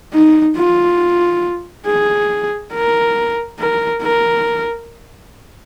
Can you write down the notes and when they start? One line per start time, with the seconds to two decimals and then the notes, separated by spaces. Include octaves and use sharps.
0.13 D#4
0.56 F4
1.87 G#4
2.73 A#4
3.59 A#4
4.02 A#4